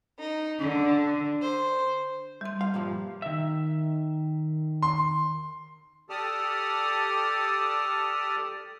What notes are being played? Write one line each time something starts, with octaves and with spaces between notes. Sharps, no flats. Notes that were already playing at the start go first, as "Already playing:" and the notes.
D#4
D3
C5
G3 C6
F5
G2 A#2 F3
D#3 E5
C6
G4 A4 D5 A5 D#6 F6